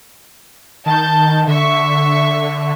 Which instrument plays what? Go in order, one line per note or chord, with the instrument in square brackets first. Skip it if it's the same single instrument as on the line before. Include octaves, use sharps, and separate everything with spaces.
[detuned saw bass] D#3 [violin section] A5 G6
[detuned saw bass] D3 [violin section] E5 C#6